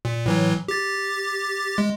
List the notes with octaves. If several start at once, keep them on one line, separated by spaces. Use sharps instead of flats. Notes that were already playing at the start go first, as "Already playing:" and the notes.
A#2
A2 E3 F#3
G4 A6
G#3